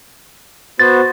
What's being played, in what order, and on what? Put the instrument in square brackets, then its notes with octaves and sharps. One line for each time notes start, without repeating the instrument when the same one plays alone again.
[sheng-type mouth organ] B3 F#4 C5 [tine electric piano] A6